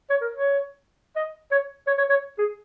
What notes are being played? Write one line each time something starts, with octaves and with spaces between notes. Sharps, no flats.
C#5
A#4
C#5
D#5
C#5
C#5
C#5
C#5
G#4